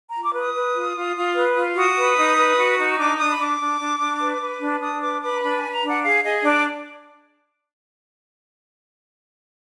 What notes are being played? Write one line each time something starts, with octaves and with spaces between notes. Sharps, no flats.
A#5
F4
D6
B4 D#6
B4
F4
F4
F4
B4
F4
F#4 D#6
B4
D#4
B4
F#4
D#4
D4 D6
D4 D#6
B5
D4 D6
D4
D4
D4
B4
B4
D4
D4 D#6
B4 D6
B4 D6
A#5
D4 B5
G#5
B4
A#5
D4 F#5
G#4 F5
G#4 D#5
D4 D5